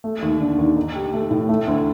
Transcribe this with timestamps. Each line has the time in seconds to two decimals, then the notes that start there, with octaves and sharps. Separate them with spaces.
0.04 A3
0.22 D#2
0.40 D3
0.58 D#2
0.76 D#4
0.95 G4
1.14 A3
1.31 A2
1.49 A3
1.68 D2